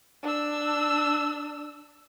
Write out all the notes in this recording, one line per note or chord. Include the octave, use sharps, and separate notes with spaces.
D4 E6